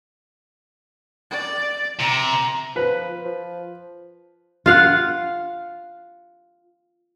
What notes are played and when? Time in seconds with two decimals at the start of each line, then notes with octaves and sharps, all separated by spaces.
1.31 D5
2.00 C3 A#5
2.76 F3 B4
3.25 F3
4.66 F4 F5 F#5